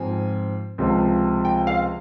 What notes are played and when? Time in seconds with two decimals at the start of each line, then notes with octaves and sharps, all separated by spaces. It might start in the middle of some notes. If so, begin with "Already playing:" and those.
Already playing: G#2 F3 C4 F4 G#5
0.78 C#2 C3 F3 C4
1.45 G5
1.67 F5